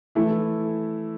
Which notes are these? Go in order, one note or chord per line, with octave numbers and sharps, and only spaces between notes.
E3 A3 E4